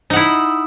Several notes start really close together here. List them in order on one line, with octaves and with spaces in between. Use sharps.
D#4 F#5 E4